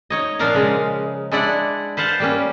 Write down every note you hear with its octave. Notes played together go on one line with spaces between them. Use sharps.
D#4 C#5 D#5
A#2 F3 D4 A#4 F5 A#5
C#3 G#3
G#3 D4 E4 D5 F#5
B4 C5 F5 F#5 A5
G3 A#3 C#4